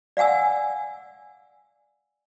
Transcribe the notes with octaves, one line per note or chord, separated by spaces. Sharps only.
D5 F5 F#5 G#5 E6